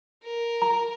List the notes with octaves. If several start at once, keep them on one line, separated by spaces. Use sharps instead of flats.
A#4
A#5